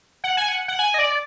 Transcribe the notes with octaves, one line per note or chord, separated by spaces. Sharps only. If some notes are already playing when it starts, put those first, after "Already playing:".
F#5
G#5
F#5
F#5
G#5
D#5
D5